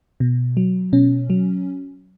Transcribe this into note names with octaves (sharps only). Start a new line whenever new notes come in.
B2
F#3
B2 C#4
F#3